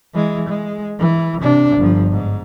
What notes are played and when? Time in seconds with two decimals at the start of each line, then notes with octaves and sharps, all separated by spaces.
0.14 E3 G#3
0.49 G#3
0.99 E3
1.41 C3 D4
1.77 G1 F3
2.11 G#2